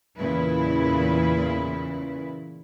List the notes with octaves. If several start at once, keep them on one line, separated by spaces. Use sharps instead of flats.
E2 A#2 C#3 E4 B4